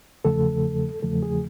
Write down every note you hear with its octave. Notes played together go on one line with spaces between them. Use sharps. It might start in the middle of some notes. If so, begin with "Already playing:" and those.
E2 C#3 F3 A3 A4
E2 C#3 F3 A3 A4
G#4